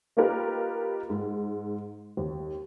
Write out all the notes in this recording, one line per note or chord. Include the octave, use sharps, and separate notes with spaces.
A#3 D#4 F4 G4 A#4 B4
G#2
D#2